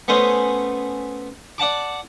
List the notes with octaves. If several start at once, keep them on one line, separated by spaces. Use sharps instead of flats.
A3 B3 C#4 C5 D#5
D5 F#5 A5 D6